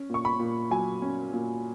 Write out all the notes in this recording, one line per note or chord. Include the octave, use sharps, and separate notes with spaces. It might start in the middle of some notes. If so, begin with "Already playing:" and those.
Already playing: C#4
A#2 C#6
B5
A#2
F#3 G#5
C#4
A#2